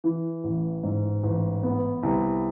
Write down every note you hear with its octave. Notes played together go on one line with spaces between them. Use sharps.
E3
A1
G#2
A1
B3
C2